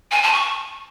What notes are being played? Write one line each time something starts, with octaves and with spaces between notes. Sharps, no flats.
G#5
A5
C#6